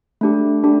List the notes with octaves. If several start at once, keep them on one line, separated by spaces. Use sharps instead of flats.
A3 D4 G4
A3 D4 G4